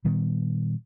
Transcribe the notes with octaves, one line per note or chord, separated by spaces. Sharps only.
A#2 D#3 G3 B3